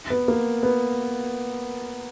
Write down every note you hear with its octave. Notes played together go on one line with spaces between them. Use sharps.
B3
A#3
B3